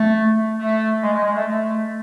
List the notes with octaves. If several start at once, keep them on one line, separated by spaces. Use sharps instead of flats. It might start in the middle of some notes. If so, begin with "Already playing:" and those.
Already playing: A3
A3
G#3
G#3
G#3
A3
A3